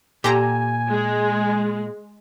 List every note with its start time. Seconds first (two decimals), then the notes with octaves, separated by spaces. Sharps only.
0.24 A#2 G4 A4 G#5 A#5 C6
0.89 G#3